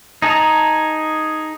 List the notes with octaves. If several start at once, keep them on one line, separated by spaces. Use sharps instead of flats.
D#4 G#4 A5 A#5